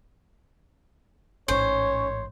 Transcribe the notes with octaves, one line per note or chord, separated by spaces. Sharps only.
A1 G#2 C#4 C5 C#5